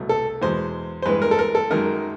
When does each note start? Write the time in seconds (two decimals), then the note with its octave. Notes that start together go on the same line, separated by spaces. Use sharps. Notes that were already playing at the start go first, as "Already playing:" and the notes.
Already playing: C2 B2 F#3 A3
0.09 A4
0.42 E2 B2 G#3 C5
1.02 C5
1.06 G2 E3 G#3 B4
1.22 A#4
1.31 A4
1.39 A#4
1.55 A4
1.71 F#2 D#3 G#3 A#4